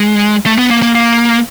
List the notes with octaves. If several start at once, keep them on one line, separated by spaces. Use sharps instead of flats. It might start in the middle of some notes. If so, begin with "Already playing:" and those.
Already playing: G#3
A3
B3
A#3
A#3
A#3